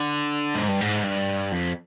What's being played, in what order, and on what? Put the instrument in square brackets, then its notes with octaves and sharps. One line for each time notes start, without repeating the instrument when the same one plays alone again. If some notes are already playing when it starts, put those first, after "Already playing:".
Already playing: [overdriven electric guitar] D3
G#2
G2
G#2
G2
F2